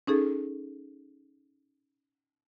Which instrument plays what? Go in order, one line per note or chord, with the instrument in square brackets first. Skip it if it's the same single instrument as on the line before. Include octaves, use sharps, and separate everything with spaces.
[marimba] C#4 D#4 G#4 A4